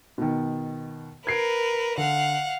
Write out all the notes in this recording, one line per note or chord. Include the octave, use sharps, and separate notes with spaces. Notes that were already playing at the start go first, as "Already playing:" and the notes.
B2 D#3
A#4 B4 G#6 C7 D7
D3 F5 F#5